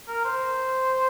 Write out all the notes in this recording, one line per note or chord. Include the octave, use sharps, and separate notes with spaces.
A#4
C5